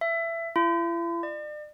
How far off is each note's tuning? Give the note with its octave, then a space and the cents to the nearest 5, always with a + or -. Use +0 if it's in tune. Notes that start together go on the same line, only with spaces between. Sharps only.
E5 +20
E4 +45
D5 +40